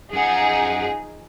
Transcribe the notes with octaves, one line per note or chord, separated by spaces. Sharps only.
F#2 F3 D#4 G#4 F#5